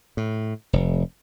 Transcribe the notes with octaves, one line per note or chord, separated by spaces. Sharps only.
A2
F1